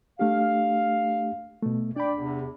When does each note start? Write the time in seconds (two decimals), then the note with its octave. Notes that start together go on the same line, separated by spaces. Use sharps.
0.19 A3 D4 G4 F5
1.62 B2 A3
1.96 D4 D5 G5 B5
2.16 E2 C3